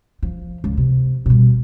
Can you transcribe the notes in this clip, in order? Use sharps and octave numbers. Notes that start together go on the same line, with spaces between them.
F3
C#2
C3
B2 G3